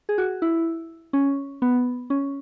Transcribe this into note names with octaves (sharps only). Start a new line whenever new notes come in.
G#4
F#4
E4
C#4
B3
C#4